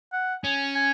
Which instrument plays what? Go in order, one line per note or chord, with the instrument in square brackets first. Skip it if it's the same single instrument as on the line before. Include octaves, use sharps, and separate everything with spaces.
[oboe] F#5
[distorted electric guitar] C#4 [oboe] G#5
[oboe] G#5